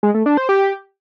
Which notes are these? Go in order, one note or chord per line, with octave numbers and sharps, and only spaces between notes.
G#3
A3
D4
C5
G4